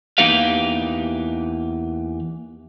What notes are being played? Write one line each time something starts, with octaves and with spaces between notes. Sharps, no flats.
E2 A#3 D#4 G4 B4 F5